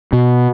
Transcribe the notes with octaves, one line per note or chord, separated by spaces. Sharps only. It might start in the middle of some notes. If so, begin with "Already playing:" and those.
B2